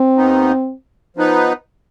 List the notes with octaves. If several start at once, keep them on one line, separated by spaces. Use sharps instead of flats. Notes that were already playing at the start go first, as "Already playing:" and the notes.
Already playing: C4
D#2 D#3 B3 D#4
F3 B3 D#4 B4